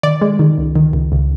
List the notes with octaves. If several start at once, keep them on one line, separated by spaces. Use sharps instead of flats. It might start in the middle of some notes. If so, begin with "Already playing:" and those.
D#3 D5
G#3
D#3
C#2
D#3
C#2
C#2